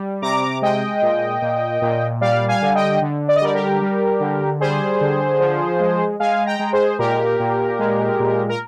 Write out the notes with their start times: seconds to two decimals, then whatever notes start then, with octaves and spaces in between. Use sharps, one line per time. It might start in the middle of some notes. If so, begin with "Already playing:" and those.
Already playing: G3
0.22 C3 A#5 D6
0.62 G#3 D#5 G5
1.02 A#2
1.42 A#2
1.82 A#2
2.21 G3 D5 F5
2.48 F5 G#5
2.62 D3
2.75 D#5 G5
3.02 D3
3.28 D5
3.36 D#5
3.41 G3 A#4 D5
3.54 G4 A#4
3.82 G3
4.20 D3
4.60 G3 G#4 C5
5.01 D3
5.40 F3
5.80 G#3
6.20 G#3 F5 G#5
6.46 G5 A#5
6.59 G#3
6.73 G#4 C5
6.99 A#2 G4 A#4
7.40 A#2
7.79 G#3
8.20 A#2
8.49 A#4